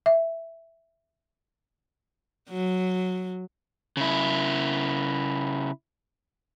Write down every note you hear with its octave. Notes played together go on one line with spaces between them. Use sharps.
E5
F#3
C#3 E4